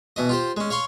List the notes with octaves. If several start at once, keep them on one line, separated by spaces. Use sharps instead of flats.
B2 E3 D#5
F4 G4 C5
G#3 C#4
C#5 F5 C6 C#6